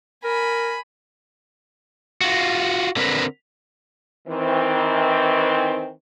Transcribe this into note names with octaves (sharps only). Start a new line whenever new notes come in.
A#4 G#5 B5
F4 F#4
D3 C4 A#4 B4
D#3 E3 C4